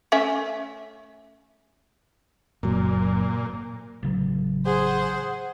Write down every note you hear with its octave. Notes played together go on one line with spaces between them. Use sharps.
A3 C#4 E5
F#1 A#2 F#3
A1 C#3 F#3
G#4 C5 F#5